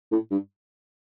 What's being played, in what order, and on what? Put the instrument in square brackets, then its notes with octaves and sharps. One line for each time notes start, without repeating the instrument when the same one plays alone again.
[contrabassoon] A2
G2